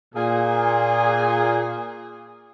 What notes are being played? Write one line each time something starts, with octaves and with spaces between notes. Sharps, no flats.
A#2 G#4